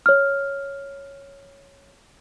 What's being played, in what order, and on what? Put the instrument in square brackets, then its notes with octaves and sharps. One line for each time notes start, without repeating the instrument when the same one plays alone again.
[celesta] C#5 F6